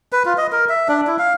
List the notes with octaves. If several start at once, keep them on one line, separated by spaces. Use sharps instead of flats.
B4
F4
D#5
A#4
E5
D4
E4
F5